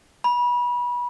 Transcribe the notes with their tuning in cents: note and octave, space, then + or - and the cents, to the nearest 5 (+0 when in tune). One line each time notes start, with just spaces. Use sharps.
B5 -25